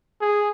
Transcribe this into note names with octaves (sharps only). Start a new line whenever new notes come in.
G#4